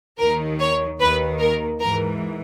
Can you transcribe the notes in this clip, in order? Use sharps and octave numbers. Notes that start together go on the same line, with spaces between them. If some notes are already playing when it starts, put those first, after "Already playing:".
D#2 D#3 A#4
C#5
D#2 D#3 B4
A#4
G#2 E3 A#4